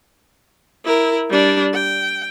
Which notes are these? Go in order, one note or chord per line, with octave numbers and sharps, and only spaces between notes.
E4 A#4
G3 D4
G5